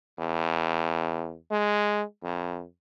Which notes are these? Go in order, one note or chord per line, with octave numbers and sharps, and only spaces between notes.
E2
G#3
F2